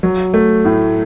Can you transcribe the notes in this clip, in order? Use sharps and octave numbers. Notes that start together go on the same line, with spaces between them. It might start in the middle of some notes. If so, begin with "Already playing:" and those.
F#3
A3
A2